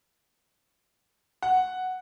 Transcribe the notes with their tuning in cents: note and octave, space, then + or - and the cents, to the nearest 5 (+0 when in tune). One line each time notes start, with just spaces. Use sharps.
F#5 +0